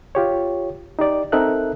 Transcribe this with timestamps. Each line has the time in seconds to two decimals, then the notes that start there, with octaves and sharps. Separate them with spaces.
0.15 F4 G4 C#5
0.99 D#4 G4 D5
1.32 C4 D#4 A4 A#4 E5 F#6